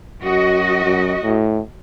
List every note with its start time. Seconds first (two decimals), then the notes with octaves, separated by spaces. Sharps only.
0.23 F#2 F#4 D#5
0.84 F#2
1.24 A2